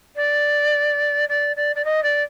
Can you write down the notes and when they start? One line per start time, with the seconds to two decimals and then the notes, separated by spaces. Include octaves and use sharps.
0.15 D5
1.28 D5
1.56 D5
1.75 D5
1.84 D#5
2.02 D5